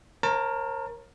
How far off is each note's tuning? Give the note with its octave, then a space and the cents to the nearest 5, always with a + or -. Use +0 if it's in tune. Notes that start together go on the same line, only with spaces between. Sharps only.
A#4 +10 C#5 -45 A5 +35